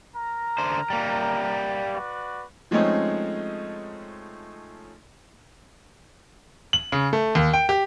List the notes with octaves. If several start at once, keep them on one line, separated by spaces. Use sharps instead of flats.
A#4 A#5
D3 C5
G3 A#3
F#4 B4 D5
F3 G#3 A3 C4 C#4 D#4
F#7
C#3
A3
D#2
G5
G4